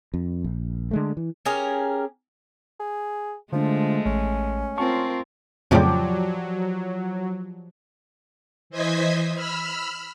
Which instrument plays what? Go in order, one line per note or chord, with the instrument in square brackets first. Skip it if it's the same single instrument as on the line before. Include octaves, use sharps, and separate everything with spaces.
[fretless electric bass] F2
A#1
D3 G#3 A3
E3
[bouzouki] C#4 G4 G#4 A#4
[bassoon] G#4
[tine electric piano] D3 D4 [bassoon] F3 [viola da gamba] G#3 A3
[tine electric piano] A1 [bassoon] C#4
[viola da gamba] C4 F4 A#4 [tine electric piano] A5 C#6
[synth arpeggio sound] F2 A2 C#3 [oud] F3 G4 D5 [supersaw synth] F#3
[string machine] E3 C5 D#5 G#6 B6
B5 E6 F6